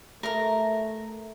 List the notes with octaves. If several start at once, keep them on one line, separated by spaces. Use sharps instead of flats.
A3 A#4 A#5